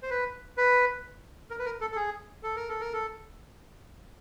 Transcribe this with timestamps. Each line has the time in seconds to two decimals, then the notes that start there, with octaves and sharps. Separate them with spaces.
0.03 C5
0.10 B4
0.57 B4
1.51 A#4
1.59 B4
1.65 A#4
1.81 A4
1.92 A4
1.96 G#4
2.43 A4
2.56 A#4
2.69 A4
2.80 A#4
2.93 A4